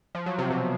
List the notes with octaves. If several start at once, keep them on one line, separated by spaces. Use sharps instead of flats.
F3
F#3
C3
B2